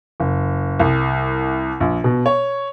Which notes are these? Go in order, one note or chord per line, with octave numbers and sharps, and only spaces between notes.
F#1
C2
A#1
B2
C#5